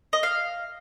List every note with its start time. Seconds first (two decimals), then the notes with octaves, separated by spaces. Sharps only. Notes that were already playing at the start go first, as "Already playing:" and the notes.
0.13 D#5
0.23 F5